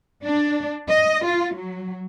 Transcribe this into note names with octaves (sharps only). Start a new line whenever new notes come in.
D4
D#5
F4
F#3